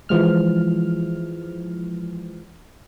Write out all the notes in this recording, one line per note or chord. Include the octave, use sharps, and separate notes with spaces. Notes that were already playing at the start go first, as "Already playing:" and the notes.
E3 F3 G#3 F6